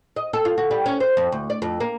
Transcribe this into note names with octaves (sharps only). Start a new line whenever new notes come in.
D#5
A4
F4
F#4
G3
C#4
C5
F2
D2
D5
F2
A#3